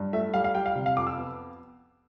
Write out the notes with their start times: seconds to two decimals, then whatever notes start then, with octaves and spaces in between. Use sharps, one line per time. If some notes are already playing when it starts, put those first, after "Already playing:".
Already playing: G2
0.13 A3 E5
0.33 G3 F5
0.44 F5
0.55 G3 G5
0.66 F5
0.76 C3
0.86 F5
0.96 F2 D6
1.07 E6
1.17 B3